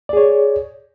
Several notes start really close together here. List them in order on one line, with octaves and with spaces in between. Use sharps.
D5 G#4 C#5